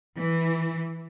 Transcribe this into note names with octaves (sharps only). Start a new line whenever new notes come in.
E3